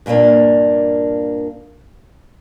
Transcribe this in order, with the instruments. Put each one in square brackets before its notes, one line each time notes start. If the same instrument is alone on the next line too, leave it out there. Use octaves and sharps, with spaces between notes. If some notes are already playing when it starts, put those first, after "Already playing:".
[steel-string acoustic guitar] G2 A#2 A3 A#3 D4